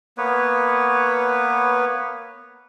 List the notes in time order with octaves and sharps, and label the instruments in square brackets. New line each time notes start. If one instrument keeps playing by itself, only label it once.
[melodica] A#3 B3 B4 C#5